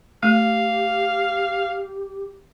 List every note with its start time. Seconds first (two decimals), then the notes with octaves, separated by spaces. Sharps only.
0.23 A3 G4 F5